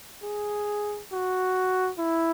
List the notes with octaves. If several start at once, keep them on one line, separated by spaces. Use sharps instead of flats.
G#4
F#4
E4